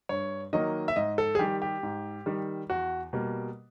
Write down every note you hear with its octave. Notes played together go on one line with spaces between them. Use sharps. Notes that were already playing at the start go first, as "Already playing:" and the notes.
G2 C#5
D#3 F#3 A#3 D#5
E5
G#2 D#5
A4
G#4
D#3 G3 G4
G4
G#2
D#3 G3
E2 F#4
B2 G3 A#3